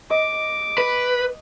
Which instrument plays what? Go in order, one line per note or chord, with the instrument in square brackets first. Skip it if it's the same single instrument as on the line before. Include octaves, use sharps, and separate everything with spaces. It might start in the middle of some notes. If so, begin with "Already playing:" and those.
[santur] D#5 [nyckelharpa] D6
[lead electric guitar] B4